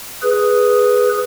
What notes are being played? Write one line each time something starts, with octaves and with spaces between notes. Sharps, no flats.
G#4 B4